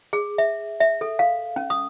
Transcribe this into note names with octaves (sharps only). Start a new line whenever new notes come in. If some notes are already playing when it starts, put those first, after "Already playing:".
G#4
E5
E5
A4
F5
C#4
D#6